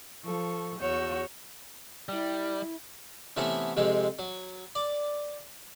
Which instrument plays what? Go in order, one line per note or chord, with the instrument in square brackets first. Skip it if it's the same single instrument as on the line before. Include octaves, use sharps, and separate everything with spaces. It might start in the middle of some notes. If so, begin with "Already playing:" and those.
[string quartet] F3 A4 C#6
E2 F#4 C#5 C#6 E6 G6
[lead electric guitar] G3 [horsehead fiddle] E4
[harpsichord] C3 E3 A3 B3 C#4
F2 C3 G#3 C4
F#3
D5